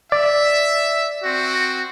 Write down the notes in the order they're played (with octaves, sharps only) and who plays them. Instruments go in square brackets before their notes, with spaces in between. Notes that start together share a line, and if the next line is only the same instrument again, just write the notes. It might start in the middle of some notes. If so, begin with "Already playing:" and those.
[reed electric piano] D5 [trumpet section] E5
[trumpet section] C4 F#4